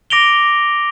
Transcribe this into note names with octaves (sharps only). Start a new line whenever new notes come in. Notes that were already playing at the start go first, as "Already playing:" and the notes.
D6 A#6 D7 F7 G7